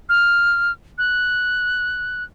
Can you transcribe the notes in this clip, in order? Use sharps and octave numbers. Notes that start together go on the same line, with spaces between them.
F6
F#6